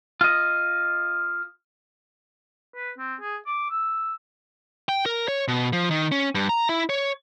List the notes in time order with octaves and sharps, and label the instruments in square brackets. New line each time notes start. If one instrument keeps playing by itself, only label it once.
[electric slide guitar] F4 D#5
[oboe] B4
C4
G#4
D6
E6
[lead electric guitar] G5
A#4
C#5
B2
F3
D#3
C#4
G2
A#5
E4
C#5